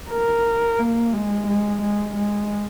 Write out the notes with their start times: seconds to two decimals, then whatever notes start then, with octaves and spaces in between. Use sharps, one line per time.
0.11 A#4
0.79 A#3
1.13 G#3
1.47 G#3
1.82 G#3
2.16 G#3